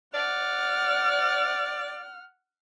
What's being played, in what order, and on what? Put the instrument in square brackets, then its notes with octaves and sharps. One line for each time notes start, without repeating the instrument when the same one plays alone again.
[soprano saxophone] D5 [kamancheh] F#5 F6